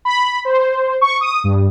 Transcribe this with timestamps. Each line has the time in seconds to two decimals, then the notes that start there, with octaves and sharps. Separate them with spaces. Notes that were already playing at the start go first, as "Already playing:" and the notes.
0.05 B5
0.45 C5
1.01 C#6
1.21 D#6
1.44 G2